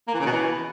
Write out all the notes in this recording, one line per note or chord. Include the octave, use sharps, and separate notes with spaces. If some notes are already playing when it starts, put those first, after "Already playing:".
A#3
E3
C#3
B2
E3